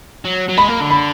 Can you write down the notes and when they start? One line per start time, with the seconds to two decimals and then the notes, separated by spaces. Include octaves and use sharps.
0.25 F#3
0.48 F#3
0.57 G#3 B5
0.68 A#3
0.80 D3
0.91 B5